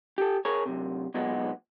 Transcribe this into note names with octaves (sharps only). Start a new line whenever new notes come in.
G4 A4
G#4 A#4 C#5
F#2 C3
B1 A#2 G#3 B3